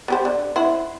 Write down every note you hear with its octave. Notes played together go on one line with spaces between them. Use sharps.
B3 G4 C5
D3
E4 C5 F#5